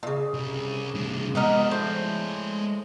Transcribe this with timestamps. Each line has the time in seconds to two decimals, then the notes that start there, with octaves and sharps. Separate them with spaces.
0.03 A#2 C#3
0.34 C2
0.95 C2 D4
1.35 G#3 B3 D#4 A#4 D5
1.71 A2 C5